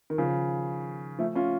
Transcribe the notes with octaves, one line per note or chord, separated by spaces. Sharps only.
D#3
C#3 F3
F3 A3
C#4 F4